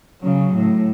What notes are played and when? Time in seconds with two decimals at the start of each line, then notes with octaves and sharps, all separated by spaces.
0.22 C#3 F#3
0.55 A2